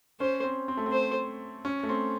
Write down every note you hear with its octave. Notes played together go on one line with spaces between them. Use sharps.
C#4 C5
C4
C4
A3
C4
C5
C#4
A3
C4